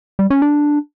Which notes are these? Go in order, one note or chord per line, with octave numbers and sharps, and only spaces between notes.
G3
C#4
D4